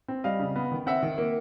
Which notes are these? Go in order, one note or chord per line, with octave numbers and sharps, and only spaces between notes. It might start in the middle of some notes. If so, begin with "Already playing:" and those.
C4
G3 D#5 F5
C#3
B3
D#3
C4 E5 F#5
D#3
A#3